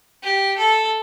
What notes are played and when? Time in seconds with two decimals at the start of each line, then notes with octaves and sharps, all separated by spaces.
0.22 G4
0.57 A4